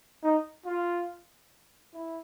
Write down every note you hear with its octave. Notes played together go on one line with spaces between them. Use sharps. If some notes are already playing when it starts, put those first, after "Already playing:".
D#4
F4
E4